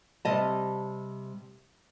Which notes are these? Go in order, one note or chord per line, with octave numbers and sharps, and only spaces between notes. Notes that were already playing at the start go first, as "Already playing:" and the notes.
C3 G3 D#5 A5